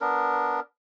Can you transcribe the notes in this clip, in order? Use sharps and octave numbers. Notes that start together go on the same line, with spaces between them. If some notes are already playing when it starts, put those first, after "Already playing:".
B3 D4 A#4